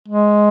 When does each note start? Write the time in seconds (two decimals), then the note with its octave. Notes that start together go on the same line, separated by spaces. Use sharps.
0.08 G#3